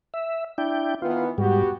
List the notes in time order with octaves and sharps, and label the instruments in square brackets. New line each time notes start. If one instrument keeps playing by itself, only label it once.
[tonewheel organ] E5
D4 E4 G5
[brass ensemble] D#3 E3 B3 [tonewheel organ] F4
[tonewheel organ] G#2 G3 [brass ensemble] B3 F#4 G4